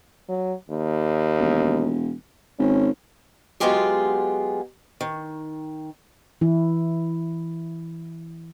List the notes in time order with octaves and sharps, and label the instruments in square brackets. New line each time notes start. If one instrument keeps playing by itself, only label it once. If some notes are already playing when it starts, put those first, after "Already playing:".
[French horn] F#3
D#2
[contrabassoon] E1
[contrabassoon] G#1 [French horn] C#4
[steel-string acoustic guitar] F#3 G#3 B3 F4 G4 G#4
D#3
[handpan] E3 E4